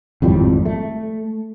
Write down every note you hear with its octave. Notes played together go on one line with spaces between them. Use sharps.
G#1 F2 A2 G3
A3